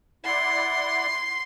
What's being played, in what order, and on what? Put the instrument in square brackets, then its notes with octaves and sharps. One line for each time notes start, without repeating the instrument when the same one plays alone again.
[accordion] E4 D5 F#5 [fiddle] C6